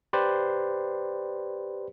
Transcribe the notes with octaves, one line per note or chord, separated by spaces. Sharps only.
G4 B4 C5 D5